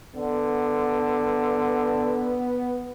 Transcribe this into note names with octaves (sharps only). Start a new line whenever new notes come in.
D3 B3